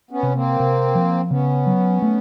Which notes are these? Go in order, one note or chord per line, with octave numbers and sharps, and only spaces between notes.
B3 C#4
C3
A#3 C4
C3
F3
C#3 B3 C#4
F#3
A3